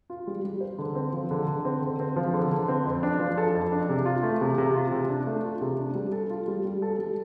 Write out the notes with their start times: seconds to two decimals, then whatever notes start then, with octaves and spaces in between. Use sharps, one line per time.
0.10 F4
0.27 G3
0.45 G3
0.61 C5
0.79 D3
0.95 C4
1.13 F3
1.31 D3
1.47 D3
1.65 C4
1.82 D3
2.00 C4
2.16 F3
2.33 D3
2.51 D3
2.68 C4
2.86 F2
3.03 D4
3.19 F3
3.38 A4
3.54 F2
3.72 D4
3.89 C3
4.05 F4
4.23 A3
4.41 C3
4.58 C3
4.76 F4
4.92 C3
5.09 D4
5.27 A3
5.45 F4
5.61 C3
5.79 D4
5.95 G3
6.12 A4
6.30 F4
6.48 G3
6.65 G3
6.82 A4
6.99 G3